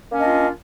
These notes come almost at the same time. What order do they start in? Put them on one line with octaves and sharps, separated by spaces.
A#3 C#4 D4 D#5 F4